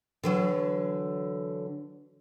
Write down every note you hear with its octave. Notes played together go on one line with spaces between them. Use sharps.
D3 E3 F#3